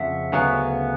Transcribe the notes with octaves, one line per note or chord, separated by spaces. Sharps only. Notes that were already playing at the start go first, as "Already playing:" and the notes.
Already playing: F2 C#3 F3 E5 F#5
D2 C#3 F#3 B3